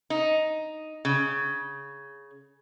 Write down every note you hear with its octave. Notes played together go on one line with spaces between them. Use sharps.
D#4
C#3